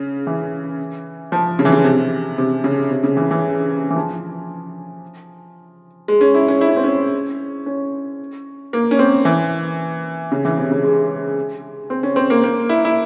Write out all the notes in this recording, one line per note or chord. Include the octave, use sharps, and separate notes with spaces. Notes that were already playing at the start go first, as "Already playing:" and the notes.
Already playing: C#3
E3
F3
C#3
E3
C#3
C3
C3
C#3
C3
C#3
E3
E3
E3
F3
G#3
C#4
E4
C#4
E4
C#4
C4
C#4
C#4
A#3
C#4
C4
E3
C#3
E3
C3
C#3
G#3
C4
C#4
C4
A#3
A#3
E4
E4